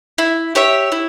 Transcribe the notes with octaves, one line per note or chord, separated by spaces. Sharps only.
E4
G4 C#5 E5
E4